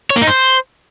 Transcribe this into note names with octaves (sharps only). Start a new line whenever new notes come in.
C#5
A#3
D#4
C5